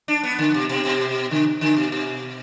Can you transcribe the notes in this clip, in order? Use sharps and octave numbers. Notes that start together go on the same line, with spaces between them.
D4
B3
D3
B2
B2
B2
D3
D3
B2
B2